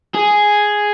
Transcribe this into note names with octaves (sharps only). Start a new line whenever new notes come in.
G#4